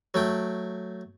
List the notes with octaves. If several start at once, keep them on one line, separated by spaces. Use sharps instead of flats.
F#3 A3 G5